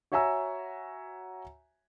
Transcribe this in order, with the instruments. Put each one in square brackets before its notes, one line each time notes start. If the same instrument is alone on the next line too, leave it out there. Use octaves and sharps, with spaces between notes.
[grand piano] F#4 C#5 E5 G#5 A#5 E6